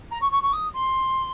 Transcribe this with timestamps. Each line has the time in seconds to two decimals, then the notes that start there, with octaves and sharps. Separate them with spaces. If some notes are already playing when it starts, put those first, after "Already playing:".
0.10 A#5
0.21 C#6
0.31 C#6
0.42 C#6
0.52 D#6
0.74 C6